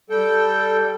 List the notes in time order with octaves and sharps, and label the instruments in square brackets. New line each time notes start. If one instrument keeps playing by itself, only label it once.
[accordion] G3 A4 G5